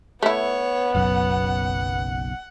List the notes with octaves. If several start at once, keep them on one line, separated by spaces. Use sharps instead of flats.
A3 B3 E4 C#5
F#1 B1 F#2 F#5